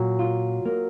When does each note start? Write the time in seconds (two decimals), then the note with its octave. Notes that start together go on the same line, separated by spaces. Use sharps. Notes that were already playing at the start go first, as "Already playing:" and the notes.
Already playing: A#2 F#3
0.19 F4
0.66 A#3